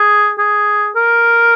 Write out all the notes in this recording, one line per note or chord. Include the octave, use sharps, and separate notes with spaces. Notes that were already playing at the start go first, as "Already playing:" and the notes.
Already playing: G#4
G#4
A#4